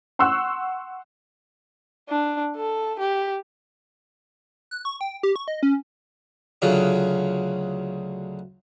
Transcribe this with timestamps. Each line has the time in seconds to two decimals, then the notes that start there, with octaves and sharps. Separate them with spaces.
0.19 F#5 C6 C#6 E6 F#6
2.09 D4
2.56 A4
2.99 G4
4.71 F#6
4.85 C#6
5.01 G5
5.23 G4
5.36 C#6
5.48 D#5
5.63 C#4
6.62 D2 C#3 F#3 F4